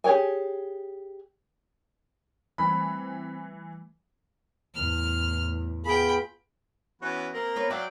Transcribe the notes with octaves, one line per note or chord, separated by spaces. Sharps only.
G4 G#4 C#5 G5 G#5
E3 G3 A3 C4 B5
E2 A2 F6
B3 F4 G#4 G5 B5
E3 B3 C#4 F#4
A#3 C4 A#5
B3 F4 C#5
F#3 F4 C#5 D5 E5 G5